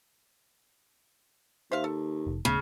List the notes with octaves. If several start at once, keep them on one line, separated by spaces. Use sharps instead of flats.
D#2 C5 E5 F5
A4
F1
D#1 C#3 A3 B3